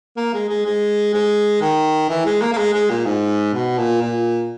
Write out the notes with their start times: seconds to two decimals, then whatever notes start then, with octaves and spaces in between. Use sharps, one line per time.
0.17 A#3
0.34 G#3
0.49 G#3
0.65 G#3
1.13 G#3
1.61 D#3
2.09 E3
2.25 G#3
2.41 A#3
2.53 A#3
2.58 G#3
2.74 G#3
2.90 A#2
3.05 G#2
3.54 B2
3.78 A#2
4.02 A#2